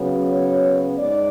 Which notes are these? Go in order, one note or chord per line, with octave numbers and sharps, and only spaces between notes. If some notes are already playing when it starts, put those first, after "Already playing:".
Already playing: C#3 F#3 B3
C#5
G#2 D5